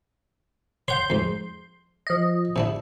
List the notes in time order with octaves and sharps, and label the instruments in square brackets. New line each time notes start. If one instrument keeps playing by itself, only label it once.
[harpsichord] C#5 F#5 [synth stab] C6 G6
[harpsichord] F2 G#2
[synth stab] F3 D#5
[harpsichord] C3 D4 E4